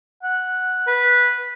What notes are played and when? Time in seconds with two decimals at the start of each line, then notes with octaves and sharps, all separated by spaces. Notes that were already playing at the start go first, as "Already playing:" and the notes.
0.23 F#5
0.87 B4